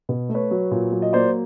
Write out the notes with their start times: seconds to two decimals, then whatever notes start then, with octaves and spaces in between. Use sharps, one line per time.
0.09 B2
0.29 A3
0.34 B4 C#5
0.51 F#3
0.71 A#2
0.92 F#3
1.02 D#5
1.13 A#3 C5 D5